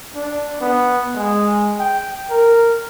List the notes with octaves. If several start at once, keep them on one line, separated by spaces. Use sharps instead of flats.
D4
B3
G#3
G5
A#4